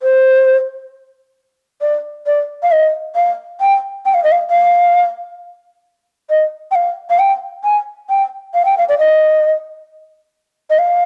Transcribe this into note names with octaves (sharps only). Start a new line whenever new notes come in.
C5
D5
D5
F5
D#5
F5
G5
G5
F5
D#5
F5
F5
D#5
G5
F5
F5
G5
G#5
G5
F5
G5
F5
D5
D#5
D#5
F5